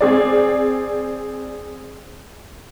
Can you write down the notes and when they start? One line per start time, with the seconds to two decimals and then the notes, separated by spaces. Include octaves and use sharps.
0.01 C4 G#4 D5